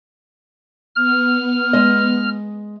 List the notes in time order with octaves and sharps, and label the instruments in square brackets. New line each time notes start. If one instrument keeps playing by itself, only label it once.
[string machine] B3 [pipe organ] F6
[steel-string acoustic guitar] G#3 D#5